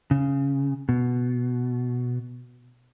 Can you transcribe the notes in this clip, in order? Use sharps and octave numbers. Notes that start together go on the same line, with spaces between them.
C#3
B2